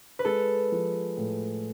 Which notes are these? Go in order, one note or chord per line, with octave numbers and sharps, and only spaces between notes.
B4
G#3 A4
F3
A2